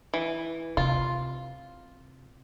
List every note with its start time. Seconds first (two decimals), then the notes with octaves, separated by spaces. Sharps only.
0.14 E3
0.77 C3 F4